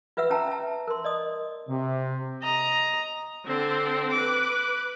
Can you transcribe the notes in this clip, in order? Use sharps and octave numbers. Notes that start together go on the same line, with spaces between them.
F4 B4 E5 F#5 E6
C#4 F4 G5 A5 A#5
E5 A5
A#4 C6
D5 D#5 D#6
C3
D#5 A#5
D3 C4
B4 D6